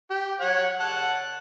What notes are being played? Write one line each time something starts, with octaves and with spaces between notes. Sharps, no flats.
G4
C#5 F#5
F#5 A5